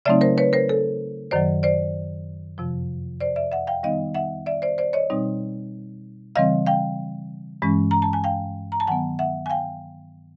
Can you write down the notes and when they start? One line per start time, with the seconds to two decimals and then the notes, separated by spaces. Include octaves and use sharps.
0.05 C#3 F#3 A3 C4 D#4 D5 E5
0.21 A#4 C5
0.38 B4 C#5
0.53 A#4 C5
0.69 A4
1.31 F#2 D#3 F#3 C5 D5
1.63 C5 D5
2.58 F2 C3 F3
3.21 C5 D5
3.36 D5 E5
3.52 E5 F#5
3.67 F5 G5
3.83 D#3 G3 B3 D#4 D#5 F5
4.15 E5 F#5
4.46 D5 E5
4.62 C5 D5
4.78 C5 D5
4.93 C#5 D#5
5.10 B2 G3 C4 D#4
6.36 C#3 E3 G3 C4 D#5 F5
6.66 F5 G5
7.62 G2 E3 G#3 C#4
7.91 A#5
8.02 A5
8.13 G#5
8.24 F5 G5
8.72 A#5
8.80 A5
8.87 D#3 F#3 B3 F#5 G#5
9.19 E5 F#5
9.46 G#5
9.50 F5 G5